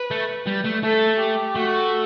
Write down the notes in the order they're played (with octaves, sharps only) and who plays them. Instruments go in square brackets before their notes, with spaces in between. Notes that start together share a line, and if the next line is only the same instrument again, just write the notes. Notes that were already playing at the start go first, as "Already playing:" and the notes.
Already playing: [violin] B4
[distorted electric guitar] A3
G3
A3
[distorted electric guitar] A3 [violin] A4
[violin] G4
[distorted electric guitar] A3 [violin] F#4